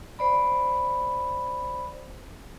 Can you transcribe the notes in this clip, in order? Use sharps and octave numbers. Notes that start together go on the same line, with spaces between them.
C5 D5 B5